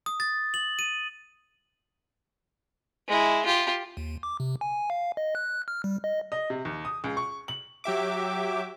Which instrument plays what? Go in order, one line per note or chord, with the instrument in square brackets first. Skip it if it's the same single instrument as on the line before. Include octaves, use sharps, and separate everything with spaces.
[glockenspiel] D#6
A6
F#7
D#7
[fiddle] G#3 E4
F4 G4
[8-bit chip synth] D#2
D6
C3
G#5
F5
D#5
F#6
F6
G3
D#5
[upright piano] D#5
C3
D#2
D#6
C#2
C#6
F#7
[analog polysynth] F#3 G4 E5 D6